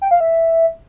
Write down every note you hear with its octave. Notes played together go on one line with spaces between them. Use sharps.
G5
F5
E5